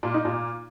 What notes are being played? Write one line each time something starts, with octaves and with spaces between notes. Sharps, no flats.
A#2
D#4
A#2